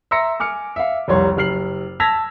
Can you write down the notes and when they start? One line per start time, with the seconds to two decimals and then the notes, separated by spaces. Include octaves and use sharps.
0.11 E5 A#5 C6 E6 A#6 C#7
0.40 G#5 D6 F6 C#7
0.76 E5 F5
1.08 F1 C2 G3 C#5 C6
1.37 F#1 G4 F6 C7 F#7
2.00 A5 E6 G#6 A#6 B6 F7